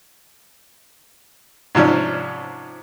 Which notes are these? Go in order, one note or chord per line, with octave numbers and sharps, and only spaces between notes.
G#2 C3 F3 C#4 D4